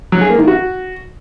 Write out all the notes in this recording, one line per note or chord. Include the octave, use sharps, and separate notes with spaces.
F#3
G#4
A#3
D#3
F#4